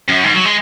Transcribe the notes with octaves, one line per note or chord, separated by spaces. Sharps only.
F#2
G#2
F#3
G#3